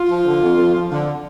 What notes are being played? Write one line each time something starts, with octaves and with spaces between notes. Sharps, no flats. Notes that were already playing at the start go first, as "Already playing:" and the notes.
Already playing: F4
F3
D3
F2
F2
F3
D3